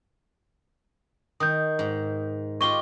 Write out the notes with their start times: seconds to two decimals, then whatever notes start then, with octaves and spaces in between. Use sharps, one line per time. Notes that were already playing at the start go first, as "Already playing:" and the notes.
1.40 D#3 D#6 G6
1.79 G#2
2.61 F4 G4 D#5 C#6 G7